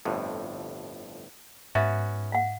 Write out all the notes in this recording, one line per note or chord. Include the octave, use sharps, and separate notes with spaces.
G1 F2 A2
G#2 B3 C#4 F#4 E5
F5 F#5